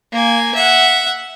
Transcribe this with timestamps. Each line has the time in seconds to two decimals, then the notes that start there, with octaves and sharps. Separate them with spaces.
0.13 A#3 G#5
0.55 E5 F#5